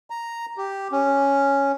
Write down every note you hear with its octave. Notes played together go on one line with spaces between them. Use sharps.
A#5
G4
C#4